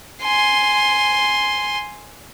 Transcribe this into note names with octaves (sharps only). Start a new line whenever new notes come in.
G#5 C6